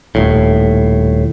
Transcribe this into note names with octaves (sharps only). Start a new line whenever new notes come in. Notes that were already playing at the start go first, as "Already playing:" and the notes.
D#1 A2